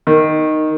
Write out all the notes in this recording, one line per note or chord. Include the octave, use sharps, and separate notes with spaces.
D#3